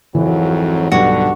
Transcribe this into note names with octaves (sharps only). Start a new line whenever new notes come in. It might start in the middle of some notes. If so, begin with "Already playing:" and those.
G#1 F2 E3 F#3
B1 G2 D3 F#4